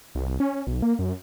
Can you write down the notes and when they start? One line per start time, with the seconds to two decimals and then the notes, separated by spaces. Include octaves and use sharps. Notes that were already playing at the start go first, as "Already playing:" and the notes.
0.15 C2
0.40 C#4
0.67 B1
0.82 A#3
0.99 F#2